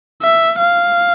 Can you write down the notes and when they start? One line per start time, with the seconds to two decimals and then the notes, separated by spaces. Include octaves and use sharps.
0.22 E5
0.58 F5